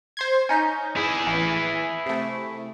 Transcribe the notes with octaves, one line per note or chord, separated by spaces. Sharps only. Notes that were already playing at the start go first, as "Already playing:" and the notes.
C5 C6 G#6
C#4 D#4 G6
E4 G#4
A1 E3
C3 A3